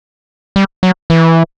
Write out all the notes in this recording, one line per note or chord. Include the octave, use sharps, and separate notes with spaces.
G3
F#3
E3